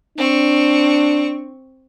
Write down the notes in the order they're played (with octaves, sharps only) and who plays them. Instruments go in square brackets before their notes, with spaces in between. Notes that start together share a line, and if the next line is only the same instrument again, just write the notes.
[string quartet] C4 C#6 [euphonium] D4